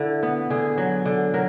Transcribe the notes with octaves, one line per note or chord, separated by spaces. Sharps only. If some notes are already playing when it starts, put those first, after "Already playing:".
Already playing: D3 E4
B3
D3 G#4
F#3
D3
F#3 A#4